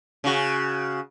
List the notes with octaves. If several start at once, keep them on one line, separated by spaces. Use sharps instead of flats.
C#3 F#4